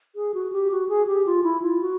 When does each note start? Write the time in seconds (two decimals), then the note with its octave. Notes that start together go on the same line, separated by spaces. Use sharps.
0.16 G#4
0.34 F#4
0.52 G4
0.71 F#4
0.89 G#4
1.07 G4
1.26 F4
1.44 E4
1.62 F4
1.81 F#4